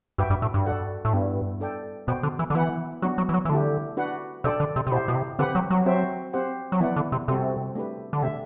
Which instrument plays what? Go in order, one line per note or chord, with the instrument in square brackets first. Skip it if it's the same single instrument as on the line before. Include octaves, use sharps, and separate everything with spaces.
[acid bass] G2 [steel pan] F#4 B4 E5 G5
[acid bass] G2
A2
G2
[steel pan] F#4 A4 D5 F#5
[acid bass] A2
[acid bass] G2 [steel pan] G3 B3 E4 B4
[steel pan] D4 A4 D5 G5
[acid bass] B2 [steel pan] B3 F#4 C5 G5
[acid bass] D3
E3
D3
[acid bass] E3 [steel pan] B3 E4 B4 F#5
[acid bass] F#3 [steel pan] B3 D4 F#4
[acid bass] F#3
E3
F#3
E3
[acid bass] D3 [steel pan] A3 E4 G4
[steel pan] D4 F#4 B4 F#5
[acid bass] C3 [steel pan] D4 A4 D5 G5
[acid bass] D3
C3
C3
[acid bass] B2 [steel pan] E4 G4 C5
[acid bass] B2
C3
[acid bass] D3 [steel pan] C4 G4 B4 F#5
[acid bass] F#3
F#3
[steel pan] C4 F#4 C5 E5 G5
C4 G4 C5 F#5
[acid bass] F#3
[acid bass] E3 [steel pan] B3 E4 B4 D5 F#5
[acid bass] D3
C3
[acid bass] C3 [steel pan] G3 C4 F#4 A4
[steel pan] A3 D4 G4 B4
[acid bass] D3
[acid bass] C3 [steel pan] A3 D4 A4 E5